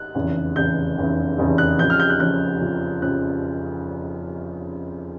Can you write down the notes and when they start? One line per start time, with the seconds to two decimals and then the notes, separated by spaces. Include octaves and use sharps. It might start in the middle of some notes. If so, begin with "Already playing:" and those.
Already playing: F#6
0.15 F1 E2 C#3
0.56 F1 E2 C#3 G6
0.98 F1 E2 C#3
1.38 F1 E2 C#3
1.58 F#6
1.79 F2 C#3 F3 G6
1.90 F6
2.00 G6
2.10 F#6
2.20 F2 C#3 F3 F#6
2.62 F2 C#3 F3
3.02 C#3 F3 F#6